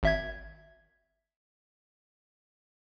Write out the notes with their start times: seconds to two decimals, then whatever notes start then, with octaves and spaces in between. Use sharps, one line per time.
0.03 G#1 E5 G#6